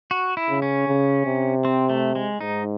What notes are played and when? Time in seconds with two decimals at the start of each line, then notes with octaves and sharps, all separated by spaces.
0.11 F#4
0.37 E4
0.49 C#3
0.62 C#4
0.88 C#3
1.26 C3
1.65 C4
1.89 A3
2.15 G#3
2.40 G#2 D#4